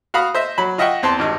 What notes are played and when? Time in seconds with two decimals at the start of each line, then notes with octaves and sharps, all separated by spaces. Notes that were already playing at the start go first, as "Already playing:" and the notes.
0.14 F#4 F5 B5 D#6
0.34 C5 D#5 E5
0.58 F#3 B5
0.78 F4 D#5 E5 F#5 G5 C#6
1.03 E2 C4 A5 C6
1.19 G#1 G2 D#4